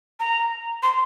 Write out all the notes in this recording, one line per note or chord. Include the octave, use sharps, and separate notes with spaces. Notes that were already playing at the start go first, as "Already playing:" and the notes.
A#5
C6